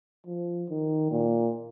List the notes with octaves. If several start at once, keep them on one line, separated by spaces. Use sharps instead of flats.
F3
D#3
A#2